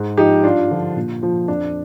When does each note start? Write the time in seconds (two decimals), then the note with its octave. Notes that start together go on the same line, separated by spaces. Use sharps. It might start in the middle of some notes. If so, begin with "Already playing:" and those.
Already playing: G#2
0.17 F3 D#4 G4
0.44 G2 D4 F4
0.71 D3 F3
0.97 A#2
1.23 F3
1.48 F2 D4